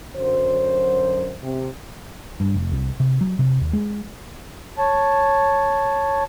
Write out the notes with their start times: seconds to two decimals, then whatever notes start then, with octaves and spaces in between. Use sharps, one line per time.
0.17 F#2 D3 F#3 C5
1.42 C3
2.40 G2
2.54 F1
2.72 C2
3.00 C3
3.21 F#3
3.39 C3
3.61 D#2
3.73 G#3
4.78 C#5 A5